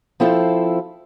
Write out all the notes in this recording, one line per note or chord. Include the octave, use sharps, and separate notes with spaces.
F3 C4 E4 F4 A4 C5